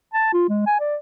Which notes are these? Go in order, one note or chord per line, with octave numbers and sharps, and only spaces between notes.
A5
F4
G#3
G#5
D5